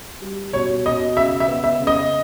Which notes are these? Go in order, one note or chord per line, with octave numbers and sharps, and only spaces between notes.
G3
B2 C#5
B2 D#5
C#3 E5
E5
B3
E5
C#3
D#5